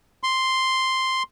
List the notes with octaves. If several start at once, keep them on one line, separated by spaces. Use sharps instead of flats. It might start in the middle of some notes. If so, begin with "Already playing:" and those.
C6